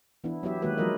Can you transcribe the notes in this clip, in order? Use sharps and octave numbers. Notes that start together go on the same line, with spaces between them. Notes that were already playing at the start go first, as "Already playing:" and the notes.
E3 B3 D4 E4
F#3 B3 E4 G4 E5
D#3 G#3 A#3 F#4 G4 B4
F3 F#3 G#3 F4 A#4 D#5